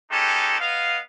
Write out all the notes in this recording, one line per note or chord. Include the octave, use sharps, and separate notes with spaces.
G#3 C#4 D#4 G4 A4
B3 D#5 F5